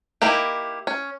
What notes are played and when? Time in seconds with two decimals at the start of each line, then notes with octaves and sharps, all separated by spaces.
0.22 A#3 D#4 E4 G4
0.87 C#4